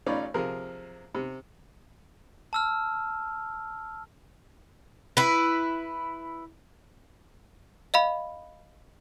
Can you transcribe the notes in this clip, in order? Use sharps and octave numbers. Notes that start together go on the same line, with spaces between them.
A1 C#4 D#4 F4 D5 B5
C3 F3 G#4 A#4
C3
A5 E6 F6
E4 B4
D#5 F5 B5